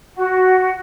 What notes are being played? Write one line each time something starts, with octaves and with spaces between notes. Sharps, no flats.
F#4